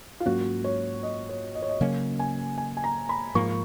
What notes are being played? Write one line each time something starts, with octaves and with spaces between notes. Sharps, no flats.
F4
G#2 F#3 A#3 C#4 F#4
C#5
D#5
C#5
D#5
C#5
D#5
C#3 F#3 A#3 C#4
G#5
G#5
G#5
A#5
B5
G#2 F3 A#3 C#6